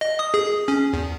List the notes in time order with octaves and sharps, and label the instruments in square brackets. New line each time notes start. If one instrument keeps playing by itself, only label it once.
[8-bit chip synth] D#5
D#6
G#4
C#4
E2